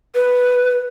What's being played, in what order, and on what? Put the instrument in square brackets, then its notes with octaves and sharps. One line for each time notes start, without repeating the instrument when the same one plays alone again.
[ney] B4